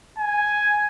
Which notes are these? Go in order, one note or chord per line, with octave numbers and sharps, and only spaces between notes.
G#5